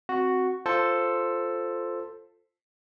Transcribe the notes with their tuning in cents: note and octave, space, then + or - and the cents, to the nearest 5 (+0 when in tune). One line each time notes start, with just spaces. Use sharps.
C4 +0 F#4 +0
F4 +0 A4 +5 C5 +0